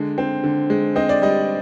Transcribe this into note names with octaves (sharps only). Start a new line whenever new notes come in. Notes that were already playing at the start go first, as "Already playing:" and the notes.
Already playing: D3 G#3
C4
D3
G#3
C4 D#5
D5
G3 D#5